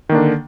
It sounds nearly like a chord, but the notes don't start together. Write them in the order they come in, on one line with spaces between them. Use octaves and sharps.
D#3 A#3 D4 D3